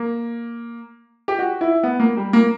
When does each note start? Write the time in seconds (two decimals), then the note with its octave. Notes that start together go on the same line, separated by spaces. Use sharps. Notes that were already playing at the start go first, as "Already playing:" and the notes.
Already playing: A#3
1.28 G4
1.39 F#4
1.61 E4
1.83 B3
2.00 A#3
2.17 G3
2.33 A#3